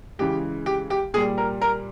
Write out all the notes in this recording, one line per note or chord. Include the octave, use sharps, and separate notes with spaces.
C#3 E3 G#3 G4
G4
G4
A#2 G3 G#4
A#4
A#4